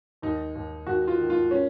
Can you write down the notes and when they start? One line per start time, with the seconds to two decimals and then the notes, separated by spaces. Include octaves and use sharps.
0.22 D#2 D#4
0.55 D#2
0.87 D#2 F#4
1.07 F4
1.19 D#3
1.30 F4
1.51 C#4